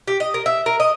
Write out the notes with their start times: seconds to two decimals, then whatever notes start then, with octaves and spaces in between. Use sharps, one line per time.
0.07 G4
0.20 D#5
0.34 A#4
0.46 E5
0.66 A#4
0.80 D#5